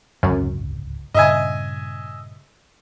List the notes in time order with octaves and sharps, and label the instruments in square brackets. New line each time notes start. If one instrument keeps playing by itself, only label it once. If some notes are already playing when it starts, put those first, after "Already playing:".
[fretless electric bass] D1 G#1 C#2 [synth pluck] F#2
[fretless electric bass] G2 A#2 C#3 [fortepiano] D#5 E5 G#5